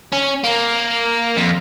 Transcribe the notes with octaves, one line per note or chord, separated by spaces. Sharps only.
C#4
A#3
F2